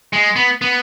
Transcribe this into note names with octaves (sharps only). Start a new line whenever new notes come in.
G#3
B3
B3